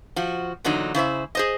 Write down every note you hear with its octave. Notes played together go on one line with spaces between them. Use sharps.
F3 F#4
E2 A#2 D3 F#3 D#4
C#3 E4 C5 E5
G#4 C5 D#5